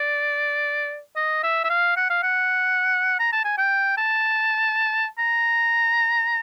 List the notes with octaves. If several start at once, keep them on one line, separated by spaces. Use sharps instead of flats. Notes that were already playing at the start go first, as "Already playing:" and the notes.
Already playing: D5
D#5
E5
E5
F5
F#5
F5
F#5
A#5
A5
G#5
G5
A5
A#5